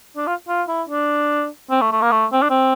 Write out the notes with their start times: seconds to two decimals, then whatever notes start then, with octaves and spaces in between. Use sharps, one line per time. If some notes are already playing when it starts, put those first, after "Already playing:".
0.17 D4
0.27 F4
0.48 F4
0.68 E4
0.89 D4
1.71 C4
1.81 A3
1.92 A3
2.01 A#3
2.11 A3
2.32 C4
2.42 D4
2.50 C4